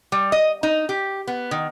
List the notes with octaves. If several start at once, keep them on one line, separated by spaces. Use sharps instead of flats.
G3
D#5
D#4
G4
B3
D#3